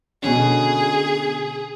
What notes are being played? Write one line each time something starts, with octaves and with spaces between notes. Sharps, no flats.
B2 D3 C#4 G#4